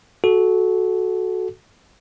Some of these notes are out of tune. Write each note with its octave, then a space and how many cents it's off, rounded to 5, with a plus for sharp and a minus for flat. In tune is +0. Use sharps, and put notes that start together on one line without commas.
F#4 +0 A4 -20